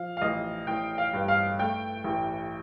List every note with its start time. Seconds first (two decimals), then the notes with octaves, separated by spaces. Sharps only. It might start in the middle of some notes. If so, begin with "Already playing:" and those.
Already playing: F3 F5
0.17 F5
0.22 A1 D#5
0.67 A1 G5
0.98 F5
1.13 G2
1.28 F5
1.59 A3 G5
2.04 A1